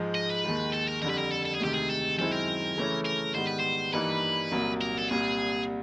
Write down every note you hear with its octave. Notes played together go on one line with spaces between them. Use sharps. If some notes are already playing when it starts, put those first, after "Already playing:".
Already playing: G#2 F3 G#3
D#5
B4
D#2 D#3 G#3
A4
A#4
F2 D3 G3 A#4 B4
A#4
A4
A4
G#4
D2 C3 D#3 G#3 G4
G#4
A4
F#2 D#3 G#3 C4 E4 A4
A#4
C#3 E3 A3 C#4 E4
A#4
G#2 D#3 G3 B3 C5
B4
C5
G2 E3 G3 A#3 D#4 B4
C2 A#2 F#3 A#3
A#4
A4
C2 A#2 G3 G#4